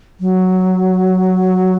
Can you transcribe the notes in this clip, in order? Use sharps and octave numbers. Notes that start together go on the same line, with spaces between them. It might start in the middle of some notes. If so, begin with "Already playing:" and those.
F#3